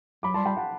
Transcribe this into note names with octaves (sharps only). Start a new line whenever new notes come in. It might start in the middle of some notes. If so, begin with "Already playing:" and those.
F#3 B5 D6
G3 A5 C6
G3 G5 B5
F#5 A5